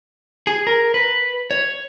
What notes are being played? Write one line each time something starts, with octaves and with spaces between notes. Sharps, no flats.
G#4
A#4
B4
C#5